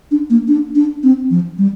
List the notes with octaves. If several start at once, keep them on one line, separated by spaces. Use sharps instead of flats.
D4
A#3
D4
D4
C4
F3
G3